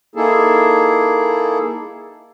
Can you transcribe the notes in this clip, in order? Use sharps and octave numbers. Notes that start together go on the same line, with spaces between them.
A#3 D#4 E4 G#4 A4